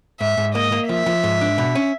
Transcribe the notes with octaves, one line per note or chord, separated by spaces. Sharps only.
G#2 E5
G#2
A#3 D#5
A#3
F3 E5
F3
G#2
D4
B2
C#4